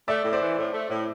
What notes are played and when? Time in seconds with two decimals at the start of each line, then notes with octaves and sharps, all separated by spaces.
0.08 A3 D5 E5
0.24 A2
0.32 C5 D5
0.41 E3
0.58 A2
0.73 A3
0.89 A2